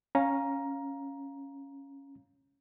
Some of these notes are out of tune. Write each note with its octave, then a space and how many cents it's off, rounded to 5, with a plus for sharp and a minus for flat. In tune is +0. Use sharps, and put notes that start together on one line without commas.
C#4 -5 F5 +10 A#5 +10